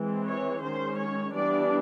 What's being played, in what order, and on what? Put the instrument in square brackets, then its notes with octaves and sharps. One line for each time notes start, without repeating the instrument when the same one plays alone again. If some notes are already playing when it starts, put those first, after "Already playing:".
Already playing: [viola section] E3 G#3 C4
C#5
D#3 G#3 C#4 C5
C#5
E3 G3 B3 D4 D5